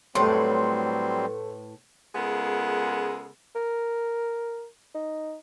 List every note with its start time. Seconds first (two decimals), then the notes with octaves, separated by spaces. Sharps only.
0.15 A2 F#3 G3 A3 C4 B4 C6
2.15 C#3 G#3 B3 F4 A4 A#4
3.56 A#4
4.95 D#4